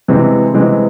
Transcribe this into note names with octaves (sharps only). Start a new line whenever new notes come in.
C3 E3 G#3 C4
C3 E3 G#3 C4